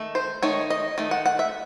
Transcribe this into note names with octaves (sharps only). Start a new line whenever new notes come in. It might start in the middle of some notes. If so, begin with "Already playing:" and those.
Already playing: D#3 A3
C5
D#3 A3 D#4 C#5
D#5
D#3 A3
F#5
F#5
E5